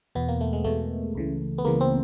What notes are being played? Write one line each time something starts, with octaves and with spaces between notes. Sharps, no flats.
E2 B2 B3
A#3
A3
G#3
E2 B2 A3
C#2 C#3 E3
B3
C#2 C#3 E3 A#3
C4